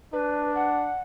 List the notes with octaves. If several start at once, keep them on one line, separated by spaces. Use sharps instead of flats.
D4 B4
F#5